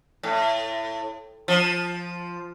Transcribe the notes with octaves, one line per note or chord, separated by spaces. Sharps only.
A2
F3